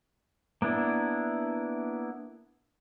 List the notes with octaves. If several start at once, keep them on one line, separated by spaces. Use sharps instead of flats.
A#3 B3 D4 E4